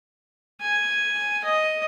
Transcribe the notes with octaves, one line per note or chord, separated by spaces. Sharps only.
G#5
D#5